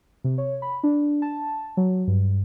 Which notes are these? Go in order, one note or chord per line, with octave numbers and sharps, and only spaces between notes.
C3
C#5
B5
D4
A5
F#3
G2